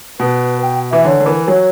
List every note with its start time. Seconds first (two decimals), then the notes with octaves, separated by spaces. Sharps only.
0.19 B2 B4
0.62 G5
0.91 E3 E5
1.05 D3 C#5
1.20 D3
1.26 E3 A#4
1.48 F#3 C#5